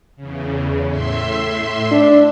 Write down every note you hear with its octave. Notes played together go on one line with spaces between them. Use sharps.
E2 C#3
A2 E5 C6
D4